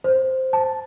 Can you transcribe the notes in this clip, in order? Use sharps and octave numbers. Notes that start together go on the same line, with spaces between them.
C5
A5